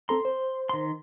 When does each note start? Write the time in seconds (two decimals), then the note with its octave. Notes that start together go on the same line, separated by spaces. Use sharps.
0.09 C4 A4 A#5 C6
0.25 C5
0.69 D#3 C6